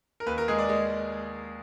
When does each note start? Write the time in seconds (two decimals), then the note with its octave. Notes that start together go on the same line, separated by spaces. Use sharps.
0.20 A#4
0.26 D#2 B4
0.38 A#4
0.48 G#3 G#4
0.59 D5
0.69 G#3